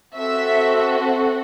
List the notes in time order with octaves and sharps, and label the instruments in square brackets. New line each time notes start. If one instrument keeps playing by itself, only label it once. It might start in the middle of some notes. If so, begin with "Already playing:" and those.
[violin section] C4 F#4 A4 E5